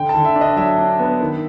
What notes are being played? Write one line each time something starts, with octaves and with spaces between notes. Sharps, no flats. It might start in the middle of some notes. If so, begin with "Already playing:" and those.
Already playing: D3 G5
A5
D3
E5
D4
D#5
F#3 E5
D4
B3
D#3